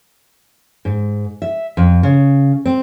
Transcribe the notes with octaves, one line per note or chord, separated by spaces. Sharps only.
G#2
E5
F2
C#3
C4